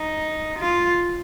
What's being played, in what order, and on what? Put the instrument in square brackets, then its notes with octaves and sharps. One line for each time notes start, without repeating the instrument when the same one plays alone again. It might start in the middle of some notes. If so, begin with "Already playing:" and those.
Already playing: [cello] D#4
F4